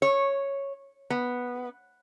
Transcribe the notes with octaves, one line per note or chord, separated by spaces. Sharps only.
C#5
B3